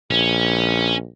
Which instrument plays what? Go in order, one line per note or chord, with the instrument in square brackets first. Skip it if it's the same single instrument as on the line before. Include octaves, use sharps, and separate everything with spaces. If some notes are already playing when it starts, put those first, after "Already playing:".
[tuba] A#1 [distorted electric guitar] C#4